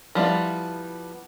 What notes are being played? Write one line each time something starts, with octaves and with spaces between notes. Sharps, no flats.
F3 G3 B3 E4